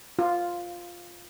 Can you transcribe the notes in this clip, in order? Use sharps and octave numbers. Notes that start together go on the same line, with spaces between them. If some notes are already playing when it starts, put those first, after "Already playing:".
F4